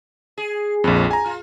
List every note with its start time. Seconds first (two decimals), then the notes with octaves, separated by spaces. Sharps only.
0.38 G#4
0.84 A#1 F2 B4
1.11 G#5 A#5
1.26 F4